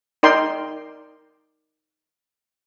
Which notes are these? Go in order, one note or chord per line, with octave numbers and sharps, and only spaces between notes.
D#4 A#4 D5 G5 C6